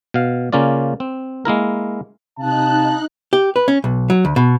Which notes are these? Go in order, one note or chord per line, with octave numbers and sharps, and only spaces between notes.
B2 F5
C#3 A#3 C#4 F4 D5
C4
G#3 A#3 E4 A#4
C3 D#4 F5 A5 F#6
G4
B4
C#4
B1
F#3
D2
B2